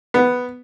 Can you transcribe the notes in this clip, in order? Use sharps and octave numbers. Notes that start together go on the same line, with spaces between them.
B3